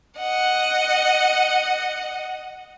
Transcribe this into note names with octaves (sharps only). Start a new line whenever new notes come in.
D#5 F#5